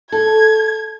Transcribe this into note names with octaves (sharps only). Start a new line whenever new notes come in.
A4 G#6